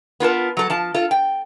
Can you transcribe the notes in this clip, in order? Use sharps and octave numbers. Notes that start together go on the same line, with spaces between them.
B3 F4 A#4 A5
F#3 A4
F3 A5
F4 A4
G5